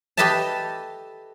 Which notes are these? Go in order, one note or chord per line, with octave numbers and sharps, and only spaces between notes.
G4 A4 B4 D#5 E5 A5